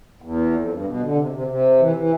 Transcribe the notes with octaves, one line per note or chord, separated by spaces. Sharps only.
E2
F2
G2
B2
D3
C3
C3
C3
E3
E3